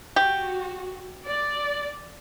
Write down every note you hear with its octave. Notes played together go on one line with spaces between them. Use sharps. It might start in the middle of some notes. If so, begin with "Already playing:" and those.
F#4 G4
D5